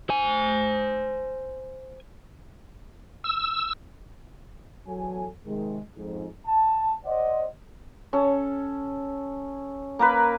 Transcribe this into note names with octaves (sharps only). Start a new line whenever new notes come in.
C5 G#5
E6
E2 F#3 A4 G#5
C3 D#3 G#3
F2 G#2
A5
C5 D5 D#5 F#5
C#4 A4
A#3 A#4 B4